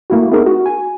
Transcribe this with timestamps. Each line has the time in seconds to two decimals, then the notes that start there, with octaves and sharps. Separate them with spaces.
0.10 A3 A#3 E4 F#4
0.32 A3 B3 C4 D#4 G#4 A#4
0.46 F#4
0.66 G#5